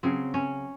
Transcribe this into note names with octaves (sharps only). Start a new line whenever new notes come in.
C#3 F#3 C4
C#4